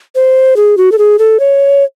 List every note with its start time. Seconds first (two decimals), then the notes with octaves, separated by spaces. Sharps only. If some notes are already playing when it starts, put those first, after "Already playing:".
0.15 C5
0.56 G#4
0.77 F#4
0.92 A4
0.98 G#4
1.19 A4
1.40 C#5